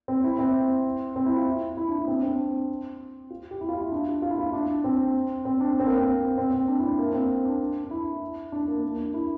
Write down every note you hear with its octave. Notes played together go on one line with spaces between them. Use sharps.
C4
E4
C4
C4
E4
F4
E4
D4
E4
C4
D4
C4
F4
G4
E4
F4
E4
D4
F4
F4
E4
F4
D4
C4
C4
D4
C4
A#3
C4
C4
C4
D4
E4
D4
A#3
C4
D4
D4
E4
D4
A#3
A#3
D4
E4